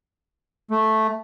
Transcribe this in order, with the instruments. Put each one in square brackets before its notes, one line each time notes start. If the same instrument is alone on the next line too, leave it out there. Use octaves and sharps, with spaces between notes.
[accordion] A3